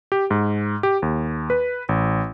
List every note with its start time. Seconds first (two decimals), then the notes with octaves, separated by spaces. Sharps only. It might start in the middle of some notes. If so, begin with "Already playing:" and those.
0.12 G4
0.31 G#2
0.83 G4
1.02 D#2
1.50 B4
1.89 A1